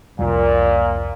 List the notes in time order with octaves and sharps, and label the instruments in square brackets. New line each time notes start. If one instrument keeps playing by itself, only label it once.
[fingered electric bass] C2 F2 G3 [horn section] A#2